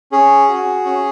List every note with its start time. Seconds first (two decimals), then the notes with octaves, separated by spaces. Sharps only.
0.12 C#4 G#4
0.49 F#4
0.85 C#4